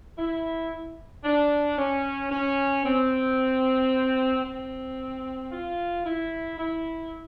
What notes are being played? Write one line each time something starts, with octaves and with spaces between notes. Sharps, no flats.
E4
D4
C#4
C#4
C4
C4
F4
E4
E4